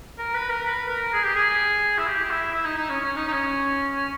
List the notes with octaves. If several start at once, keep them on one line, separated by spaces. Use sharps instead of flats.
A#4
B4
A#4
B4
A#4
G#4
G4
G#4
E4
G4
G4
E4
E4
D#4
D#4
C#4
C#4
D#4
D#4
C#4
C#4